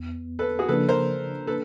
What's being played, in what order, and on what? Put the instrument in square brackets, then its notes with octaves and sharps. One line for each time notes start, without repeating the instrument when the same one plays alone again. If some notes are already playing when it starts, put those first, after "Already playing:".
Already playing: [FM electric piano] E2 B3
[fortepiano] A4 B4
F#4 G#4
[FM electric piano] C#3 F3 A#3 D4 [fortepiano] A4 B4
[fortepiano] A#4 C5
A4 B4